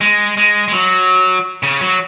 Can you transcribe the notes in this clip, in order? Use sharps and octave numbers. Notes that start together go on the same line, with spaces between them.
G#3
G#3
G#3
F#3
C#3
F#3